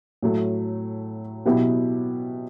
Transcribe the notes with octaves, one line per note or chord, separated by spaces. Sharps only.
A2 F#3 A3
B2 F#3 B3 E4 G4